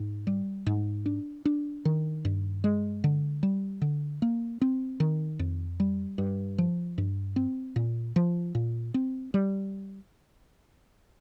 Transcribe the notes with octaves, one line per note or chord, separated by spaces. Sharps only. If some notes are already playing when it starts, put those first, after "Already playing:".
Already playing: G#2
G3
G#2
D4
D4
D#3
G2
G#3
D3
G3
D3
A#3
C4
D#3
F2
G3
G2
F3
G2
C4
A#2
F3
A#2
C4
G3